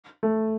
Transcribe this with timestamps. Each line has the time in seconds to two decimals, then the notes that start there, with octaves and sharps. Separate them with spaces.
0.23 A3